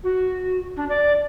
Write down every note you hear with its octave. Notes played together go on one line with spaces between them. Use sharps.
F#4
D4
D5